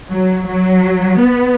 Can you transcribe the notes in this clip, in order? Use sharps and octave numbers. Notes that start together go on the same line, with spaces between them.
F#3
F#3
B3